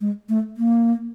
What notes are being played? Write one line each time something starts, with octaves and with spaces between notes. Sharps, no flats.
G#3
A3
A#3